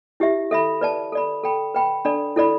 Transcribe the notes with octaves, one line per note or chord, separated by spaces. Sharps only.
E4 G4 E5
A4 E5 B5
B4 D5 A5
A4 D5 B5
A4 G5 B5
B4 G5 B5
D4 A4 D5 B5
E4 A4 D5 B5